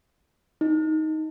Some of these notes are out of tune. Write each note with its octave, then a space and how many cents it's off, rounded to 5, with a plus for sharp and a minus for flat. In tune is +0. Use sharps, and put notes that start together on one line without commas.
D#4 +10